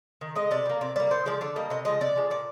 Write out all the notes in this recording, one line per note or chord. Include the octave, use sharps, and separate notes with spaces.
D#3
G#3 D#5
C3 D5
G3
A#3
C3 D5
G3 A#3 D5
A#2 C5
F3 G#3 D5
D3 D5
G3 A#3 D#5
C3 D#5
F3 G#3 D#5
C3 D5
F3 G#3
A#2 D5